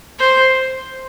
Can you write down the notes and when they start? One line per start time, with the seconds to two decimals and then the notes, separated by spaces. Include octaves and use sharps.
0.19 C5